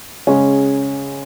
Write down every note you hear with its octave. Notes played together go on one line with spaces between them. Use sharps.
C#3 G#3 C#4